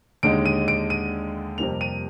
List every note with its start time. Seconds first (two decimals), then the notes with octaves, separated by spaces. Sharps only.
0.23 D#2 D3 G#3 D#4 D7
0.46 D#7
0.68 D7
0.90 D#7
1.58 F2 C3 G3 A#3 F7
1.81 D#7